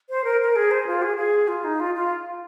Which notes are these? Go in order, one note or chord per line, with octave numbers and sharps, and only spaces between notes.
C5
A#4
A#4
G#4
C5
F4
G#4
G#4
F4
D#4
F4
F4